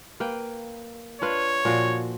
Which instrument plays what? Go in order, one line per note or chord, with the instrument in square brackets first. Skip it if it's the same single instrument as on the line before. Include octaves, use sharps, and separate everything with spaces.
[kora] A#3 B4 G5
[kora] D4 F4 B4 [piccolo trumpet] C#5
[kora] A#2 F3 F#4